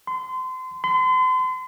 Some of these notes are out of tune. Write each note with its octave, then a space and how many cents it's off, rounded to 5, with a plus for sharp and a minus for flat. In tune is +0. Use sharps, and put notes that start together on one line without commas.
C6 -30
C6 -40